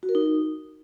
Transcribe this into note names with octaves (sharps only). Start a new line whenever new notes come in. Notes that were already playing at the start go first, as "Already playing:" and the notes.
F#4
A#4
D#4